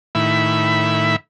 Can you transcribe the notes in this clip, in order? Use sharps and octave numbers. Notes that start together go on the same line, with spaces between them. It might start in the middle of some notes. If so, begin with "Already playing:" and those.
A2 D#3 E4 E5 B5